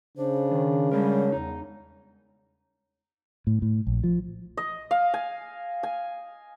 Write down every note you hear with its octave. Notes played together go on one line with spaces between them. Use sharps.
C#3 D4 C5
D#3
G3 G#3 A#4 C#5
E2 D#4
A2
A2
A#1
F3
D#5
F5
G#5
G#5